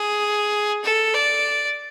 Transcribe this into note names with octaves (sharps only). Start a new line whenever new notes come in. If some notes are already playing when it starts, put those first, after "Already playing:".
Already playing: G#4
A4
D5